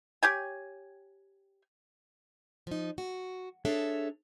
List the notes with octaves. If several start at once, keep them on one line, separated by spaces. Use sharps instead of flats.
G4 C#5 G5 G#5
F3 D#4
F#4
D4 G#4 A4 C#5 E5